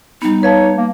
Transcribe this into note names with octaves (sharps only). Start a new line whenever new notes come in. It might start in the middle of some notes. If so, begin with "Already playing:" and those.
G3 B3 D#4
B4 C#5 F5 A5
A#3